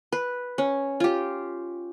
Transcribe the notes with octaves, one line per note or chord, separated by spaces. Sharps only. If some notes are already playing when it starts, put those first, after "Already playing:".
B4
C#4
F4 G4